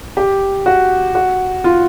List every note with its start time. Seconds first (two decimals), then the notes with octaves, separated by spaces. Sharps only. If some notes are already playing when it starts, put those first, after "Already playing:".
0.17 G4
0.66 F#4
1.15 F#4
1.64 F4